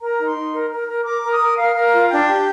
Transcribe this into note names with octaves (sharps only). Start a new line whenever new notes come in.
A#4 A#5
D#4
C6
D#4
A#4
A#4
A#4
A#4 D6
A#4
D#6
A#4
A#4 F5
A#4
F4
D4 G5
G4